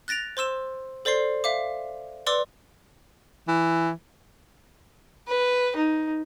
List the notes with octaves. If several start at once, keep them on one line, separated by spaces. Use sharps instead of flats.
F#6 A6 A#6 D7 F7
C5 C6 E6 E7
A4 C5 D5 C6 C7
E5 F5 D6
B4 D5 C6 D6 E6
E3
B4
D#4